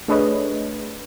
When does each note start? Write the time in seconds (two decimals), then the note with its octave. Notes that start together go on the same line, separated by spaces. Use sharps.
0.08 A3 D4 G#4 B4 C#5 D#5